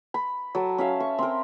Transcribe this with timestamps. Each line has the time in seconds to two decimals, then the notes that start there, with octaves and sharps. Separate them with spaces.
0.14 B5
0.55 F#3 A4
0.78 C#4 E5 F5
1.00 C#6
1.19 C4 A#4